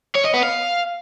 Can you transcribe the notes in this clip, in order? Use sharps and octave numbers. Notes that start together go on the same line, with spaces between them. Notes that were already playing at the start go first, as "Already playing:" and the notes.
C#5
D#5
B3
F5